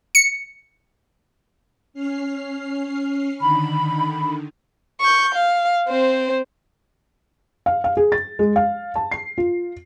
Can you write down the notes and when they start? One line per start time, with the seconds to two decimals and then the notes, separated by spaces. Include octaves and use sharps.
0.15 C#7
1.94 C#4 F6 C7
3.39 D3 D#3 B5
5.01 C#6 G6
5.35 F5
5.88 C4 C5
7.66 F5
7.84 F5
7.97 G#4
8.12 A6
8.39 G#3
8.56 F5
8.96 A5
9.11 C7
9.38 F4